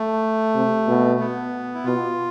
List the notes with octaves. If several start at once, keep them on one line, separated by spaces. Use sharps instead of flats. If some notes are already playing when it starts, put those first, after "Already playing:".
Already playing: A3
C3
B2
B3
E4
B2 F4